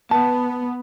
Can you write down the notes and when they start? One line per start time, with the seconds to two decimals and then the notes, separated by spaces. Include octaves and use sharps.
0.11 B3 A5